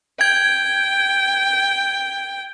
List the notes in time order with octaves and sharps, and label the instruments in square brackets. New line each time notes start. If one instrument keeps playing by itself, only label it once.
[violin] G5 [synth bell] G#6